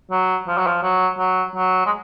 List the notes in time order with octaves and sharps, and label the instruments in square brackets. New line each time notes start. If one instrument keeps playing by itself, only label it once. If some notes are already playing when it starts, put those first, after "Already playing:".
[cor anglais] F#3
F3
F#3
F3
F#3
F#3
F#3
G#3